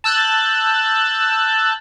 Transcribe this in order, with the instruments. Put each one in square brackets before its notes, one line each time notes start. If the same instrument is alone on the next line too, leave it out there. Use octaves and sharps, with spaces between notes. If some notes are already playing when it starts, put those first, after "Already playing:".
[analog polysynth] A5 E6 F#6 G6 A6